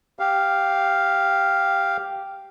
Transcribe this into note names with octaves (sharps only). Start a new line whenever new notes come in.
G4 F5